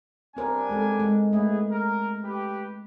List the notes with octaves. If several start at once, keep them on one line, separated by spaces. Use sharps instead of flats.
G3 C4 D4 A#4 C5 G#5
G#3 C4 A4
G#3
A3 B3 E4 G#4 E5
A#4
G4 B4